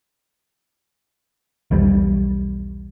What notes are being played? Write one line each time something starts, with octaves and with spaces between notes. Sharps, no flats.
B1 E2 G3